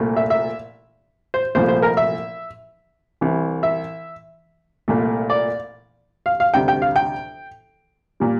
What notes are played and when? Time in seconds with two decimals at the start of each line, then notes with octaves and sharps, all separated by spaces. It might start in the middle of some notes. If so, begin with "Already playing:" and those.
Already playing: C2 A#2 A3
0.16 E5
0.30 E5
1.34 C5
1.55 C2 A#2 F3 A3 C5
1.68 C5
1.82 A#4
1.97 E5
3.21 C2 C3 E3
3.63 E5
4.88 C2 A#2 A3
5.30 D5
6.26 F5
6.40 F5
6.54 D2 C3 G3 G5
6.68 G5
6.82 F5
6.96 G5
8.20 A#2 G3